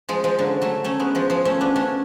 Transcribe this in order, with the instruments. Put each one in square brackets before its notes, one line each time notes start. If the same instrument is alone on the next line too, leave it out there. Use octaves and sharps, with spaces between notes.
[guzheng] F3 G#3
F3 G#3
D3 F#3
F#3 A3
A3 C#4
G#3 B3
F3 G#3
F3 G#3
A3 C#4
B3 D4
A3 C#4